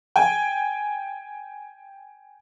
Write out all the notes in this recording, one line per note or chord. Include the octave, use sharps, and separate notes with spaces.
G5 G#5